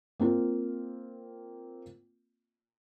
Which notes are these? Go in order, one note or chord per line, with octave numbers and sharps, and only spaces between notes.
A#3 C4 F4